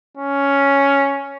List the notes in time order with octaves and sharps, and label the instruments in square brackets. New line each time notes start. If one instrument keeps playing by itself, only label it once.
[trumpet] C#4